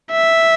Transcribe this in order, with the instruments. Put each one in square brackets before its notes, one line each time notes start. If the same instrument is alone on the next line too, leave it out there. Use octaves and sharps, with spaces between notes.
[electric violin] E5